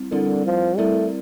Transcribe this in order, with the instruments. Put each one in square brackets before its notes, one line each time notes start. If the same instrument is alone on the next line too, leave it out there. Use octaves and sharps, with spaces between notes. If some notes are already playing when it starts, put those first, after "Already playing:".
Already playing: [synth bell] G3 C4 E4
[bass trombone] D3 [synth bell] G3 C4 E4 A#4 D5
[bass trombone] F3
[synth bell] G3 C4 E4 A#4 D5 [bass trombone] A3